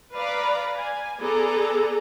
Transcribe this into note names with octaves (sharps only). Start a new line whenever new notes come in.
B4 D5 F5 A#5 B5
G#5
B3 G#4 A4 D5 A#5